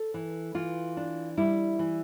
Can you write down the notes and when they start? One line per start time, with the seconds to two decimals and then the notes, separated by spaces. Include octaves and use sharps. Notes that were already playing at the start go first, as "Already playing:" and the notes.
Already playing: A4
0.14 E3
0.54 E3 F4
0.97 D4
1.37 G3 E4
1.79 E3